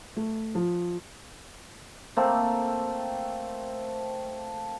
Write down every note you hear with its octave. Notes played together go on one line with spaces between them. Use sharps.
A3
F3
A3 A#3 C4 A4